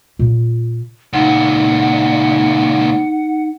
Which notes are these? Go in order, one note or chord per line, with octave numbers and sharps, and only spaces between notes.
A#2 F4
C#2 A#2 D#4 F#5